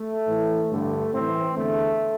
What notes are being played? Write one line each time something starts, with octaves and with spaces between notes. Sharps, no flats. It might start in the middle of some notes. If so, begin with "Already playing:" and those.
Already playing: A3
A2 E3
G2 D3 A3
A2 E3 C4
E2 D3 A3